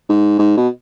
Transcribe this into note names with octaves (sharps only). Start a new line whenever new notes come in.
G#2
G#2
B2